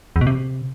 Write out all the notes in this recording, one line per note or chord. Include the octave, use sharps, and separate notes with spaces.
E2
B2
C3